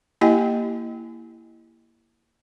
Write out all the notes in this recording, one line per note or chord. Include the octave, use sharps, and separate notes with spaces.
A#3 E4 G4 D#5 G5 G#5